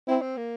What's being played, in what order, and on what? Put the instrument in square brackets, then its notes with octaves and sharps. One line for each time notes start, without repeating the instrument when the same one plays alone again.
[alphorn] C4 [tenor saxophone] E4
[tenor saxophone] C4
A#3